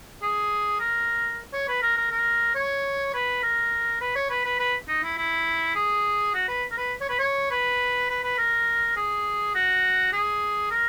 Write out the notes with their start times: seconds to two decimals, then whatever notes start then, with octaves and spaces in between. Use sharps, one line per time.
0.22 G#4
0.80 A#4
1.53 C#5
1.68 B4
1.83 A#4
1.97 A#4
2.11 A#4
2.55 C#5
3.14 B4
3.43 A#4
4.01 B4
4.16 C#5
4.30 B4
4.45 B4
4.59 B4
4.88 D#4
5.03 E4
5.18 E4
5.76 G#4
6.34 F#4
6.48 B4
6.71 A#4
6.78 B4
7.01 C#5
7.10 B4
7.19 C#5
7.51 B4
8.10 B4
8.24 B4
8.38 A#4
8.96 G#4
9.55 F#4
10.13 G#4
10.71 A#4